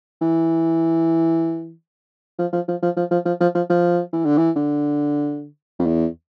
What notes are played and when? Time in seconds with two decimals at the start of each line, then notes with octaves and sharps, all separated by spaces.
0.21 E3
2.39 F3
2.53 F3
2.68 F3
2.82 F3
2.97 F3
3.11 F3
3.25 F3
3.40 F3
3.55 F3
3.69 F3
4.13 E3
4.25 D3
4.37 E3
4.56 D3
5.79 F2
5.86 E2